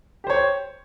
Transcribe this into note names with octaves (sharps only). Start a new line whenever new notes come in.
G4 C5 C#5